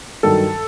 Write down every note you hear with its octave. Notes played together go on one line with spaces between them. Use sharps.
G2 D#3 F#3 A4